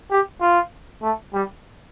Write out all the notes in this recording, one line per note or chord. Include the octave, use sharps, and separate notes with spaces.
G4
F4
A3
G3